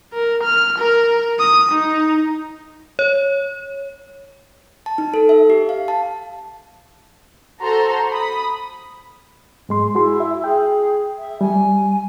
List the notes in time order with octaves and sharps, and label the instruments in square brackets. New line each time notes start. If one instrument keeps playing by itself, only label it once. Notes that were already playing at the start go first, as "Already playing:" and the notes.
[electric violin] A#4
F6
A#4
D#6
D#4
[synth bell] C#5
[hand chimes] A5
D#4
A4
E5
G4
F5
A5
[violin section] F#4 A4 C5 A#5 C6
B5 D#6
[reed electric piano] G#2 G#3 C6
[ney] E4 [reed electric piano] F#4 G#4 C6
[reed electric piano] E5
[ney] G#4 [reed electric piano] G5
[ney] E5
[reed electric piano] G3 [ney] G#5